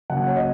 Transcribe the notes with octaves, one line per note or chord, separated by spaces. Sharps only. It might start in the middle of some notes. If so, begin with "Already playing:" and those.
C#3 F#3 A#3 F#5
C#5
D#5